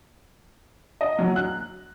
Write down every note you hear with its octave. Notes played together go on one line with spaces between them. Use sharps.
D#5
F#3
F#6